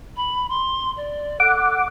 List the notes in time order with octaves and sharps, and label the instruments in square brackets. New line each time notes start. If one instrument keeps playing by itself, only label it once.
[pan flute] B5
C6
D5
[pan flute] A4 [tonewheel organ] F#5 D6